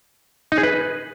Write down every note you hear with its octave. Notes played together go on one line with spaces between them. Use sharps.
D#4
G#4
B4